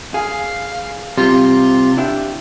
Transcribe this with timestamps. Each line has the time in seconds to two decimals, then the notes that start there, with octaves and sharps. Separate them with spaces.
0.14 G#4 F5
1.18 C3 G3 F4
1.97 D4 E4 G4